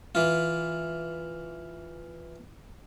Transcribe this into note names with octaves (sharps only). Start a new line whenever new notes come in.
E3 F4